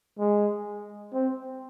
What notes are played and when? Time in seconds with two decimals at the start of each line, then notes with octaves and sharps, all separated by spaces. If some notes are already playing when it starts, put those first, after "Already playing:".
0.19 G#3
1.14 C4